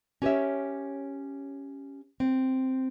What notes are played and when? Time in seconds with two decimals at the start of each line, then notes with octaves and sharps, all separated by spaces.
0.22 C#4 G4 A#4 C5 C#5 E5
2.20 C4